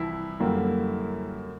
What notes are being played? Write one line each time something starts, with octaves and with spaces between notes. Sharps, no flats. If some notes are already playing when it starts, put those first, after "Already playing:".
Already playing: C2 E3 F3 E4
F#2 D3 G3 A#3